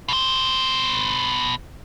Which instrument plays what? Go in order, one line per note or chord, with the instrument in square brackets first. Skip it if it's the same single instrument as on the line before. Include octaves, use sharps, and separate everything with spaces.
[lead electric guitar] B2 C5